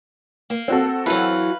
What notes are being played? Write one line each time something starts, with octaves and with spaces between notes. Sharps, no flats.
A#3
C4 F#4 A4
E3 F#3 B4 F5